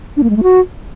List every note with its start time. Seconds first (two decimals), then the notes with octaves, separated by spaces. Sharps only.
0.17 D4
0.23 A#3
0.30 G#3
0.36 A3
0.43 F#4